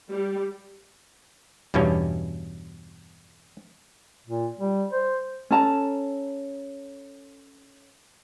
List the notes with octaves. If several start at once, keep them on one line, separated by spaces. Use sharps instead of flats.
G3
E2 G2 B2 G3 C#4
A#2
G3
C5
C#4 A4 A5 A#5